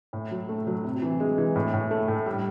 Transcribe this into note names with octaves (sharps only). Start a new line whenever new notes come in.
A2
F#3
A3
F#3
C3
E3
G#3
E3
A2
A2
A3
A2
G3